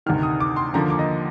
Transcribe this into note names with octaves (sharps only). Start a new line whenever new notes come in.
D2 C3 D#3 F6
D#6
D6
C6
D#2 D3 F3 A#3 A#5
D6
D#5